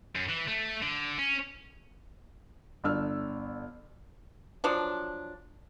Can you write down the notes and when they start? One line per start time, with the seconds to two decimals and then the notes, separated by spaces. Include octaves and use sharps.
0.15 F#2
0.29 E3
0.48 A3
0.83 D3
1.18 C#4
2.84 G1 D4 E6 F6
4.64 F3 F#3 D4